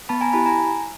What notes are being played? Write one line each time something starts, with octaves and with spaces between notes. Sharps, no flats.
B3 A5 B5
G#5 A#5
E4 G4 A5 B5
G#5 A#5